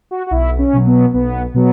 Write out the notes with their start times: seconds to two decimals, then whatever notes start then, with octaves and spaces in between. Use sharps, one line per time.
0.11 F#4
0.27 F#4
0.31 B1 E4
0.58 C#4
0.73 B2 F#3
0.86 B3
1.14 B1 B3
1.54 B2 F#3 B3